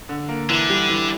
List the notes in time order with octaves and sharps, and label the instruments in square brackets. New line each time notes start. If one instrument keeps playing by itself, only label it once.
[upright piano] D3
A#3
[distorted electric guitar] D3 [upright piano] E3
[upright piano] G3
E3